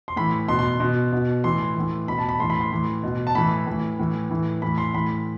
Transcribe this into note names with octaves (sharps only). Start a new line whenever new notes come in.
C6
A2 E3 B5
B2 C6
C6
B2
B2
A2 E3 C6
A2 E3
B2 B5
A5
B5
A2 E3 C6
B5
C6
A2 E3
B2
A5
A2 E3 B5
A2 E3
A2 E3
A2 E3
A2 E3 B5
C6
A2 E3 B5